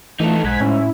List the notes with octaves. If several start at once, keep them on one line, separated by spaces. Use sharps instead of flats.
E3 A3 D#4 F4 A4
B1 G#2 F#6 G#6 B6
A2 C#4 E4